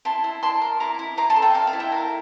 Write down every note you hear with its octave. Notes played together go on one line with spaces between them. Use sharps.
E4 A5 C6
E4
D5 A5 C6
A#4
E4 A#5 D6
E4
C5 A#5 D6
A5 C6
A4
E5 G5
D5 F5
F5
E4
E5 G5
A#4 F5 A5